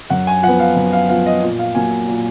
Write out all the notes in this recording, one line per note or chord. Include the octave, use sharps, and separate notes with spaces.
F#2 F#5
G#5
F3 B3 F#5
F5
F#2
F5
F3 B3 F5
D#5
A#2
F5
F#3 A#3 G#5
A#2